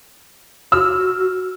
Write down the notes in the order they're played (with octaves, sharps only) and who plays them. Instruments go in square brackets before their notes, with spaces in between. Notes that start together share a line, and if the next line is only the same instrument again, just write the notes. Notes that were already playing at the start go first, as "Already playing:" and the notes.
[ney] F#4 [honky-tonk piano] E6 F6